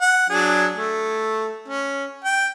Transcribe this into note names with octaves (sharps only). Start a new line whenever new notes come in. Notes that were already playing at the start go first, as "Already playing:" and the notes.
F#5
F#3 D4 G#4
A3
C#4
G5